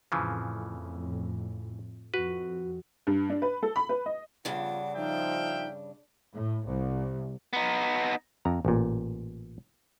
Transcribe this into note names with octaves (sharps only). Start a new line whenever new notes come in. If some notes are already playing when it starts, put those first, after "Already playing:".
F2 A2 C#3 E3 F3
F2 F#4 B4
G2
D4
B4
A4
B5
B4
D#5
G2 C#3 F3 B3 D4 F4 F#5
F3 D#4 E5 F5 G5
A2
C2
B3 D#4
F2 A#5
A1 A#2